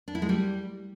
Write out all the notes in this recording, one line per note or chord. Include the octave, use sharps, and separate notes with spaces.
D4
E4
G#3
G3